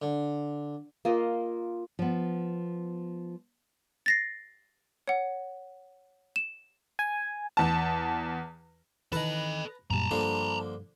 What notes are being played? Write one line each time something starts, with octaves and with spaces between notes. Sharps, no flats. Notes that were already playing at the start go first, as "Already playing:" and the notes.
D3
A#3 F4 D#5
F3 B3
A6 A#6 C7
C#5 F#5
E7
G#5
E2 A5
D#3 E3 A4 B4 D#5 A5 A#5
F#2 A#2 G3 A5 A#5
G2 D3 F3 A#3